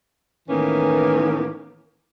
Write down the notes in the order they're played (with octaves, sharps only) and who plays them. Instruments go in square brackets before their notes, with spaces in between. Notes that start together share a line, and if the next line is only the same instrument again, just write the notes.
[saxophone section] A2 D#3 E3 A#3 B3 C#4